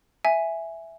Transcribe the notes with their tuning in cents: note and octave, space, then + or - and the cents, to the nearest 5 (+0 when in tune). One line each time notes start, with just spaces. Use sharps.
E5 +0 G#5 +0